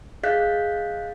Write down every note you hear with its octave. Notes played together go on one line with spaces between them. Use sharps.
G#4 D#5 F5 F#6 G6 B6